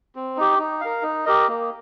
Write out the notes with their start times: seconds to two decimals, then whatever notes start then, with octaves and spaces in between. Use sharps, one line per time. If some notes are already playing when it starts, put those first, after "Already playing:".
0.16 C4
0.37 D#4 G4
0.59 D#4
0.81 A#4 F5
1.03 D#4
1.25 G4 A#4 D#5
1.48 A#3